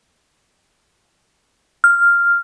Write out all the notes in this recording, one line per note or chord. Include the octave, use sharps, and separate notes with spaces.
F6